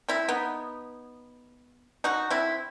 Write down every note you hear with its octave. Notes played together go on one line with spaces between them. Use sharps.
C4 E4
B3 D#4
D#4 F#4
C4 E4